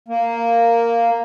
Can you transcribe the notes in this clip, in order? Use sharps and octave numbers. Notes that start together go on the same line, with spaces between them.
A#3